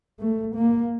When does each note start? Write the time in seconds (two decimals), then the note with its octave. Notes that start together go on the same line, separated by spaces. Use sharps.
0.19 A3
0.55 A#3